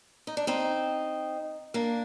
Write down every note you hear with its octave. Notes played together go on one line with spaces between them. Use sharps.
D#4
D4
C4 D#4
A#3 D4